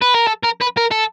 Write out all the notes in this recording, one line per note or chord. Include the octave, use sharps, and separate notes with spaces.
B4
A#4
A4
A#4
B4
A#4
A4